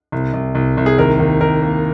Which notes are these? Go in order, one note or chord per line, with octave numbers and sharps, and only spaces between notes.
C2
C2
C2
C2
G#4
D#2 A#4
D#2
D#2 A#4
A#3